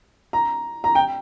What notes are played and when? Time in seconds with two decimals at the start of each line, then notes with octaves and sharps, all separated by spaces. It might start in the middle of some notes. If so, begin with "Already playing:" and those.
0.33 A#5
0.84 A#5
0.95 G5